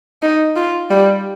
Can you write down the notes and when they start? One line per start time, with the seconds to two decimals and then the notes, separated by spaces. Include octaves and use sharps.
0.22 D#4
0.56 F4
0.90 G3